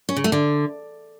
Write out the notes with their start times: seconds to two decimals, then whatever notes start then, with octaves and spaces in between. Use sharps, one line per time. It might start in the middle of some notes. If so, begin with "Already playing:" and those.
0.09 C#4
0.16 C#3
0.24 A3
0.32 D3